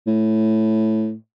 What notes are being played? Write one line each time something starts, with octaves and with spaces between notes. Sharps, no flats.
A2